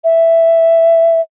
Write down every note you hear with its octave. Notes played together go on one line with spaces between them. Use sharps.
E5